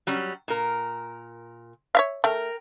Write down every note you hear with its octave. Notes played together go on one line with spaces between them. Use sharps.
F#3 G3 C#4
A#2 A#4
C#5 E5 F5
A3 A#4 G5